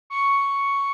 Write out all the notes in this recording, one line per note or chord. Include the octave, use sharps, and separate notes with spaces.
C#6